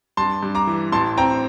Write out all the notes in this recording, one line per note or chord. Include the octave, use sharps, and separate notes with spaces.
G2 A5 C6
G2
A#5 D6
E3
A1 A5 C6
C4 G5 A#5